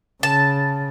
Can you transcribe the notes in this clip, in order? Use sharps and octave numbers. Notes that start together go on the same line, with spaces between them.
C#3 A5